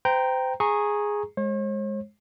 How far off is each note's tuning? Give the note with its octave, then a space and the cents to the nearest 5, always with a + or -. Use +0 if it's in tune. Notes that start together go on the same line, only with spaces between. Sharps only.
C5 -30 G5 +0 A#5 +0
G#4 +0 A#5 +0 C#6 -15
G#3 +0 C#5 -45